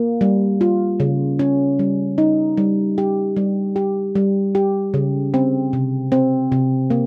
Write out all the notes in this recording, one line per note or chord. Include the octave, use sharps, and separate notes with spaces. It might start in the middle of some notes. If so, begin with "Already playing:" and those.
Already playing: A#3
G3
F4
C#3
C#4
G3
D#4
G3
G4
G3
G4
G3
G4
C#3
C4
C3
C4
C3
A#3